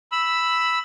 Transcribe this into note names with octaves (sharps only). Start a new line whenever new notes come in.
B5 E6